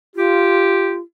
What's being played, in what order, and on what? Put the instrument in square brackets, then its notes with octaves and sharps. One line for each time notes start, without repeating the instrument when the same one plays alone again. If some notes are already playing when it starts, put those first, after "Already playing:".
[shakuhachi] F4 [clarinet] G4